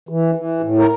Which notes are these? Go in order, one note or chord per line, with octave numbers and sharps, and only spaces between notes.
E3
E3
A2
A#4